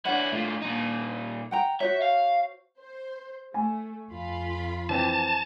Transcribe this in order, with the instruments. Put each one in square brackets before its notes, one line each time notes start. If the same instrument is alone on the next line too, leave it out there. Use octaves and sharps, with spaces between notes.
[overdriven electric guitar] C#4 E4 [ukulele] D4 F#5
[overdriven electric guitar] A2 F4
A#2 D#4
[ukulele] F#5 G5 A#5
[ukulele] F#4 C5 C#5 [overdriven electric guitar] E5
[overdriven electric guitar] F5
[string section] C5
[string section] A3 [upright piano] G#5
[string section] F2 F4 B5
[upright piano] E3 C4 [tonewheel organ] A5